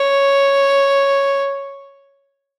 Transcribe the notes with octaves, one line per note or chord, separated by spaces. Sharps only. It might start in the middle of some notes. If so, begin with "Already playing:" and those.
Already playing: C#5